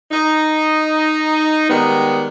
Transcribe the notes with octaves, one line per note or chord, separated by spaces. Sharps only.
D#4
D#3 G3 G#3 B3